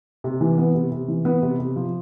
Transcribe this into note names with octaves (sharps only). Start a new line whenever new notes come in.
C3
E3
B3
C3
C3
E3
B3
C3
C3
F3